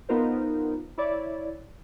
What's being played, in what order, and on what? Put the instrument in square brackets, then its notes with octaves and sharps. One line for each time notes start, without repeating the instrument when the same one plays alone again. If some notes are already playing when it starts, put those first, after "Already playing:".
[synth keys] B3 D#4 F4 A#4 C5
E4 C#5 D5